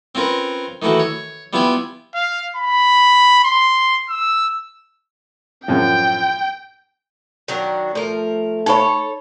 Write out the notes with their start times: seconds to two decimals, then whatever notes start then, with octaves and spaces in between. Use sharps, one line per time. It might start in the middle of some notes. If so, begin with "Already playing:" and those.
0.15 C4 C#4 F4 A#4 B4
0.82 D#3 E3 A3 E4 F#4
0.99 C#5
1.53 G3 B3 E4 F4 G5 G#5
2.15 F5
2.56 B5
3.44 C6
4.09 E6
5.68 F#2 A2 F3 G5
7.48 D#3 F#3 D4
7.95 F3 A3 A#4
8.66 D#4 A4 A#4 C#5 B5